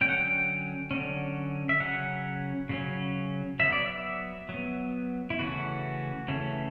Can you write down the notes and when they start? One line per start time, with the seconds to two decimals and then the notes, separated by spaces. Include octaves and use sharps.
0.01 D3 F#3 C#4 G5
0.09 F#5
0.17 G5
0.91 D3 F#3 C#4
1.69 E5
1.80 C#3 F#3 C#4 F#5
2.69 C#3 F#3 C#4
3.60 F#3 B3 E5
3.72 D5
3.86 E5
4.49 F#3
4.54 B3
5.30 E4
5.39 C#3 E3 A3 C#4 F#4
6.28 C#3 E3 A3 C#4